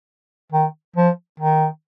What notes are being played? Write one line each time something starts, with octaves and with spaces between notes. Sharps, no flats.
D#3
F3
D#3